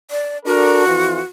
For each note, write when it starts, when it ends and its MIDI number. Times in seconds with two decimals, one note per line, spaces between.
0.11 0.38 74
0.46 0.85 62
0.46 1.25 66
0.46 0.85 69
0.46 0.85 70
0.86 1.19 41
0.86 1.19 52
0.86 1.19 65